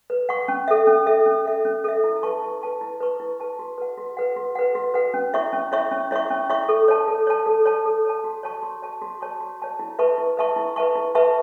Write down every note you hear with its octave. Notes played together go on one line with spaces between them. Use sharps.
B4
F#5 C#6
C#4
A4 E5
C#4
A4 E5
C#4
A4 E5
C#4
A4 E5
E4
B4 A5 C#6
E4
B4 A5 C#6
E4
B4 A5 C#6
E4
B4 A5 C#6
F#4
B4 F#5
F#4
B4 F#5
F#4
B4 F#5
F#4
B4 F#5
C#4
E4 C#5 E5 C#6
C#4
E4 C#5 E5 C#6
C#4
E4 C#5 E5 C#6
C#4
E4 C#5 E5 C#6
A4
C#5 A5
A4
C#5 A5
A4
C#5 A5
A4
C#5 A5
F#4
C#5 A5 C#6
F#4
C#5 A5 C#6
F#4
C#5 A5 C#6
F#4
C#5 A5 C#6
E4
B4 E5 A5 C#6
E4
B4 E5 A5 C#6
E4
B4 E5 A5 C#6
E4
B4 E5 A5 C#6